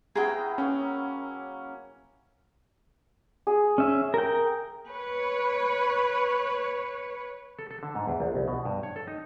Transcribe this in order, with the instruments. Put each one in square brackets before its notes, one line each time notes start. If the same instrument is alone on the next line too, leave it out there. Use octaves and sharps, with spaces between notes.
[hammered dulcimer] B3 C#4 E4 [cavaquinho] G#4 G5 [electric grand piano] A#5
[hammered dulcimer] F#3 A#3 [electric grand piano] C#4
[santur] G#4
[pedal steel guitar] C#4 E5
A#4 G5
[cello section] B4 C#5
[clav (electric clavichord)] A4
A4
D3
G#2
E2
A#1
C2
B2
G2
C#5
A4
D#4